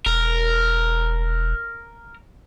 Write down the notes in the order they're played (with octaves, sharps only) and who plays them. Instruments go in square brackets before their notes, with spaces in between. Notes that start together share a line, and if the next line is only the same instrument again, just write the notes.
[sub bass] E1 [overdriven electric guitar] A#4